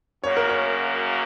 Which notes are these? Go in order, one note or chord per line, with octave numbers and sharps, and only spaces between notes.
F#2 C#3 A#3 F#4 C#5
A#4
C#5